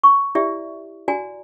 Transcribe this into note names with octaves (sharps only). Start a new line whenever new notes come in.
C#6
E4 G4 D5 E5
F#4 D5 G#5 A#5